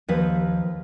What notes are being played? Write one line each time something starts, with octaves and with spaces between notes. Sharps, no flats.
D#2 F3 B4